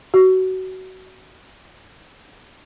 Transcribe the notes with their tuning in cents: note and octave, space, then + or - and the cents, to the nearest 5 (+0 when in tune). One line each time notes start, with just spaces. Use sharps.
F#4 +20